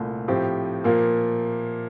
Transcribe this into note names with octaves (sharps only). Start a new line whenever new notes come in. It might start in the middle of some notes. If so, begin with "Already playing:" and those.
Already playing: C2 A#2 A3
A2 F3 C4 G4
A#2 F3 A#3